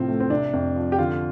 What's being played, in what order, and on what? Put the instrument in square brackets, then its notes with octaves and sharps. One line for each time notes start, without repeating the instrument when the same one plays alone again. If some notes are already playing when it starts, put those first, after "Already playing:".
Already playing: [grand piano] A2 C3 F3 C4
A3
C4
C3 D4
F2
F3
G4
D3 F4